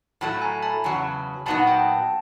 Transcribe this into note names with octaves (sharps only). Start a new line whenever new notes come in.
A2 F#3 A3 A5 B5
G#5 A#5
A5 B5
E2 C#3 F#3
A#2 F#3 B3 D#4 F#4 A5 B5
G5 A5